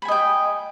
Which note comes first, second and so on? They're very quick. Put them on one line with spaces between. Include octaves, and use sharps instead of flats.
B5 G#5 D#5 G5